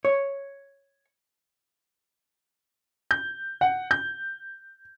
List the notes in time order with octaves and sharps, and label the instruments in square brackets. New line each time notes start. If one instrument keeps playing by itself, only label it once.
[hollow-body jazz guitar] C#5
[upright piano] G6
F#5
G6